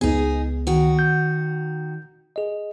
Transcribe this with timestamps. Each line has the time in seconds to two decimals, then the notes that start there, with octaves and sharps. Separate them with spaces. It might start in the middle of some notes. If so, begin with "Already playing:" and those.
0.01 C#2 B3 D#4 G#4
0.67 D#3 F#4
0.99 G6
2.36 G#4 D#5